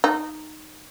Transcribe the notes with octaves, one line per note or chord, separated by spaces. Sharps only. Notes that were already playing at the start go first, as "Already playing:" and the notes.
D#4